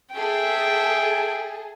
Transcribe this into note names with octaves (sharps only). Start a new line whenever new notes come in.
G#4 A4 E5 G5